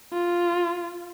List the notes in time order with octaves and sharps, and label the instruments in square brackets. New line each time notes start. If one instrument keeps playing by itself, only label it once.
[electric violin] F4